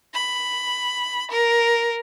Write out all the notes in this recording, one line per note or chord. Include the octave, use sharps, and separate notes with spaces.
B5
A#4